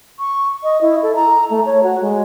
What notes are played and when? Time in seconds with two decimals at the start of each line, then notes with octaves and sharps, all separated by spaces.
0.19 C#6
0.63 D#5
0.81 E4
1.02 A4
1.15 A#5
1.50 A3
1.65 C#5
1.83 F#4
2.01 G#3